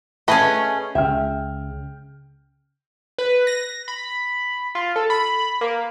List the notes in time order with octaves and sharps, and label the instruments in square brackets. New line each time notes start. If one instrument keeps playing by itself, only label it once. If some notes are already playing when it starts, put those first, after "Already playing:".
[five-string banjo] A3 B4 [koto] C#4 G#4 D#5
[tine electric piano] C#2 C#3 [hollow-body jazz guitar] E5 [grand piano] G5 F6
[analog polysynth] B4
A#6
B5
F4
A4
B5
A#3